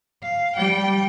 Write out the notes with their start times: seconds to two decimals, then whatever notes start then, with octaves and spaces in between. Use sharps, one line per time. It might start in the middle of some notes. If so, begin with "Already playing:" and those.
0.23 F5
0.56 G3 G5